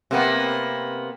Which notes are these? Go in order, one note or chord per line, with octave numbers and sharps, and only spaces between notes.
C3 A#3 B3